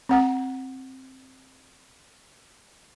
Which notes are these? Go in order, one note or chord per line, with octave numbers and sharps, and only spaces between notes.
C4 F#5 A#5